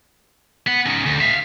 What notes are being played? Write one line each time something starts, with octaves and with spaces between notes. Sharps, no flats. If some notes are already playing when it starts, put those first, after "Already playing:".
B3 F#5
C#4 D#4
D2
E5 F5